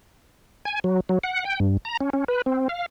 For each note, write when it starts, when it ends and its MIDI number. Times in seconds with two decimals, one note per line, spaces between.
0.65 0.80 80
0.84 1.00 54
1.09 1.19 54
1.24 1.44 78
1.45 1.60 79
1.60 1.77 43
1.85 1.97 82
2.01 2.10 61
2.13 2.24 61
2.28 2.42 71
2.46 2.68 60
2.69 2.86 77